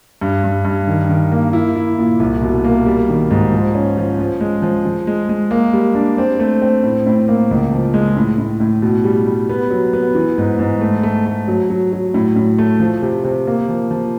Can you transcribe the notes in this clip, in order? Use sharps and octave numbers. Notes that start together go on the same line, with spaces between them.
G2
G2
G2
D#3
D#3
A#3
E4
E4
A#2
C2
B2
A#3
G3
D#3
G#2
F3
C#4
F3
F3
G#3
F3
F3
G#3
G#3
A#3
G3
D4
C4
A3
C4
A2
A2
A#3
C#2
F3
G#3
A2
A2
A2
B2
G3
G3
B3
F#3
B3
E3
G#2
G#2
A3
A3
A3
F#3
F#3
F#3
A2
A2
A3
F3
C3
C3
A#3
F3
F3